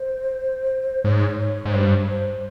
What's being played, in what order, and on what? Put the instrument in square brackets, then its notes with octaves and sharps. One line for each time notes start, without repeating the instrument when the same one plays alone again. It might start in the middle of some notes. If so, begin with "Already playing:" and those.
Already playing: [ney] C5
[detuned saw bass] G#2 [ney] C#5
[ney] C#5
[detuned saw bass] G#2
[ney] C#5
[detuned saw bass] G2 [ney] C5
[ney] C5